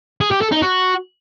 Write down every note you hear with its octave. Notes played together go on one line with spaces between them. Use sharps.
G#4
G4
A4
D#4
F#4